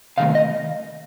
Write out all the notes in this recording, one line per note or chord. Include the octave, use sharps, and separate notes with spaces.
C3 D#3 A3 F5
D#5